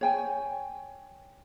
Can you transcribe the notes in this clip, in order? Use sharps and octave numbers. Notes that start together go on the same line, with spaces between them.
C#5 G5 G#5